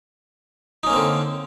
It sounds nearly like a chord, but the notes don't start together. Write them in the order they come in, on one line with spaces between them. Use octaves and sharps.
D#4 C#4 A#3 C4 D3